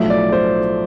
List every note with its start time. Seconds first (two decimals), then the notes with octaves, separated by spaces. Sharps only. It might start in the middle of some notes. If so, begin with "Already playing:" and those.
Already playing: B1 A2 F3 A3 E5
0.10 D5
0.32 C5